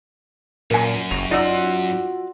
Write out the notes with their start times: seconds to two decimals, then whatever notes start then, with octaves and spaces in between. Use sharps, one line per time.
0.71 F#2 A#2 A#4 G#5
1.11 F#1 F#4 F7
1.31 D#4 F4 F#4 D5 F#5 E6